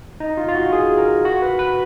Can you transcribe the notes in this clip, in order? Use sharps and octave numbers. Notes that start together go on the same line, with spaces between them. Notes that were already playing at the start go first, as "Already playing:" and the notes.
D#4
F4
F4
F#4
G#4
A#4
F#4
B4
B4